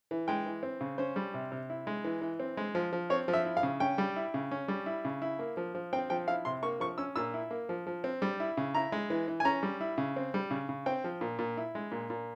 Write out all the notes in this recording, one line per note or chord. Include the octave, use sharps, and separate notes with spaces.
E3
G#3 G5
E3
C4
C#3
C#4 C5
G3
C3
C3
E4
G#3
E3
E3
C4
G#3
F3
F3
C4 C#5
F3
E5
E4
F5
C#3
C#4 G5
G3
E4
C#3
C#4
G3
E4
C#3
E4
A#3
F3
F3
C4 G5
F3 G5
E4 F5
C3 C6
A#3 C#6
F3 C#6
C#4 E6
A#2 E6
E4
A#3
F3
F3
C4
G3
E4
C#3
E4 A#5
G#3
E3
E3
G#5
C#4 A#5
G3
E4
C#3
C4
G3
C#3
C#3
C4 G5
F3
A#2
A#2
E4
G#3
A#2
A#2